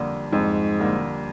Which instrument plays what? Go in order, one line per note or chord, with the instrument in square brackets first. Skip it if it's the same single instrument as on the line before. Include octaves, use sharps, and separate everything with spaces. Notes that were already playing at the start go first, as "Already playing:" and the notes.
Already playing: [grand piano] F2 D3 G3 A#3
[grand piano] F2 [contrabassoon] G#2
[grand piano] D3 G3 A#3